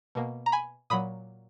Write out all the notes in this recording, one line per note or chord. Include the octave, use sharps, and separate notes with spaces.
B2 A#3
A#5
G#5 B5
A#2 F#3 B5 D#6